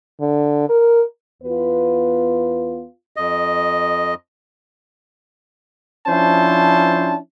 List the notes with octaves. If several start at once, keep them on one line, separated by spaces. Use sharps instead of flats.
D3
A#4
E2 B3 F4 B4
F2 D#5
F3 C#4 D4 E4 C5 A5